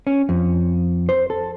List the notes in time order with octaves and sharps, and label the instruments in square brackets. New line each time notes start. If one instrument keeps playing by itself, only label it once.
[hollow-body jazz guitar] C#4
F2
C5
A4